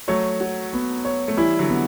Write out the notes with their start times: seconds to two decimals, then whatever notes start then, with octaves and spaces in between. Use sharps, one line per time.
0.08 F#3 A3 C#5
0.40 F#4
0.73 B3
1.05 C#5
1.28 A3
1.37 E3 G3 E4
1.59 D3 F#3
1.69 B3